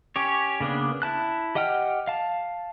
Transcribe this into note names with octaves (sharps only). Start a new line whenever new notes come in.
C#4 G4 C#5
C#3 A#3 B3 D4
E4 A5 F#6
G4 D#5 F#5 G5 F6
F5 A5